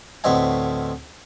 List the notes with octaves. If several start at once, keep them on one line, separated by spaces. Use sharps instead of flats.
D2 A2 B3 C4 D#5 G#5